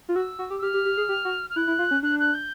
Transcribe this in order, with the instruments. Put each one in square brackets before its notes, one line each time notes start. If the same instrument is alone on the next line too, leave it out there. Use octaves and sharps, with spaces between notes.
[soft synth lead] F4
[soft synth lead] F#4 [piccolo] E6
[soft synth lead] F#4
G4
[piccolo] E6
[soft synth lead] G4 [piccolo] F6
[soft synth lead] G4
G4
G#4
G4
F#4
[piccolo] F6
[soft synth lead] E4 [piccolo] F#6
[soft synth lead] E4
F4
C#4
[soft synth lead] D4 [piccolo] F#6
[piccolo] F#6
G6